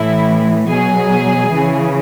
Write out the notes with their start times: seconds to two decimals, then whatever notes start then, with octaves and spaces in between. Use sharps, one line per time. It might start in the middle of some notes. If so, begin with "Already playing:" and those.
Already playing: A2 E3 E4
0.70 B2 F#3 G#4
1.51 C#3 E3